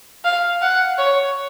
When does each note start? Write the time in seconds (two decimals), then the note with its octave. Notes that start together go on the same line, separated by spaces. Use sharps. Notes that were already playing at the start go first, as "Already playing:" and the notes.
0.25 F5
0.62 F#5
0.98 C#5